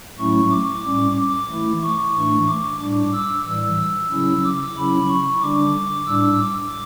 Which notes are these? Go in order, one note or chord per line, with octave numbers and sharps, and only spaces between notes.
A2 F#3 A3 C#4 E4 C#6
D6
A2 G3 C#4 D6
D6
E3 A3 E4
C#6
A2 E3 A3 D4
D6
A2 G3 D4 D6
E6
A2 E3 G3 E6
C#3 F#3 C#4 E4
D6
C#3 F#3 C#4 E4 B5
C#6
D3 G3 D4 D6
A2 G3 D4 E6
D6